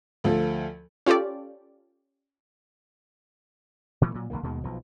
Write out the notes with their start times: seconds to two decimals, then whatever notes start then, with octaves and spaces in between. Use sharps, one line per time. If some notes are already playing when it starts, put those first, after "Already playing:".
0.24 D2 F3 A4
1.06 C#4 F4 G4 A4 D5
4.01 A#2 E3 F#3 A3
4.14 A#2 F#3
4.30 A#1 E2 D#3 A#3
4.43 D#2 B2 D#3 G#3
4.64 B1 B2 F3